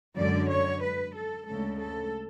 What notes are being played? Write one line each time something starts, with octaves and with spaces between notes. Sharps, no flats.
F#2 D3 G#3 D5
C#5
B4
A4
D2 C#3 G#3 A4
A4